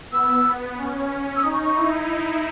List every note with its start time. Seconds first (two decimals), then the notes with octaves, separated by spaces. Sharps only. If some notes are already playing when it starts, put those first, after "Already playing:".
0.12 B3 E6
0.78 C#4
1.36 E6
1.42 D#4 D#6
1.53 C#6
1.64 C#6
1.75 E4